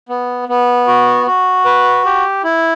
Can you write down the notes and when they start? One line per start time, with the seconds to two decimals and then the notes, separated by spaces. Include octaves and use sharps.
0.09 B3
0.49 B3
0.87 F#4
1.26 F#4
1.65 B4
2.05 G4
2.44 E4